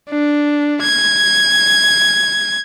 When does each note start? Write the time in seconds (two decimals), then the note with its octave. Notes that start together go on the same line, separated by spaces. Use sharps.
0.10 D4
0.82 G#6